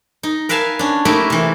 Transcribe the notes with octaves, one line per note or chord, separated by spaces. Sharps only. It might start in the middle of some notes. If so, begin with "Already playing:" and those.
D#4
A#4 B4 E5 F5 G#5 A5
C#4 D4
A3 A#3 D#4 E4 G4 B4
C3 E3